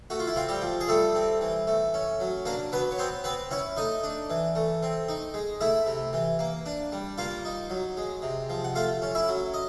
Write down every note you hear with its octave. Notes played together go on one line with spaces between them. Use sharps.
A3 F#4
F4
E4
C4 F4
G3 G4
F3
G#4
G3 A3 A4
C4
E3
A3
C#4
F#3
A#3 D4 A#4
F#3 B3 B4
C#5
B3 C4 C5
B3 C4 B4
C#4 E4 C#5
A3 D#4 D#5
D4
E3
A3
C4
D#4
G#3
A3 E4 E5
C3
E3
A#3
D4
G3
A#3 F4 F5
D#4
F#3
G#3
C3
F3
F#5
A3 F4 F5
C#4
E4 E5
F#3
D#5